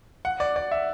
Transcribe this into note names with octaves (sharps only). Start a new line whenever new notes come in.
F#5
D5
D5
E5